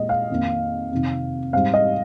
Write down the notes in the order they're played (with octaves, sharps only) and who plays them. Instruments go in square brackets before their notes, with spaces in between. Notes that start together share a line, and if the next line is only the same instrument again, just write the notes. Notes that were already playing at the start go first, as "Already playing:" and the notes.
Already playing: [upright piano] A#2 G#3 D#5
F5
F2 D#3 A#3 D#4
F2 C3 D#3
G#2 G3 C4 F5
D#5